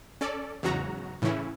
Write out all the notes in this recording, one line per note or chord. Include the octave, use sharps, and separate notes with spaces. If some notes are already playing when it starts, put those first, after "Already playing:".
C#4 A4 D5
E2 G#2 C#3 F#3 F#4 A#5
A2 C#3 E3 C#4 E4